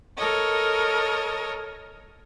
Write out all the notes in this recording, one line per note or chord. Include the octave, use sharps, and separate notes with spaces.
A4 A#4 C#5 D#5